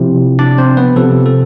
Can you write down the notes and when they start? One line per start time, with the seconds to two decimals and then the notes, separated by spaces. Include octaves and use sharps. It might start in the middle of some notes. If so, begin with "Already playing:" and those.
Already playing: C3 F3 E4
0.39 D4 D5
0.58 C4 C5
0.77 B3 B4
0.96 C3 F3 A4
1.26 A4